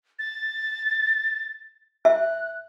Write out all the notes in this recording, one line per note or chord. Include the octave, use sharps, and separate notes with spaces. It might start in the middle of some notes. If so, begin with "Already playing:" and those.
A6
E5 F#6